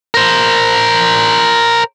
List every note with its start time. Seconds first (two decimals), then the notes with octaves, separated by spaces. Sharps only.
0.14 A#4 C5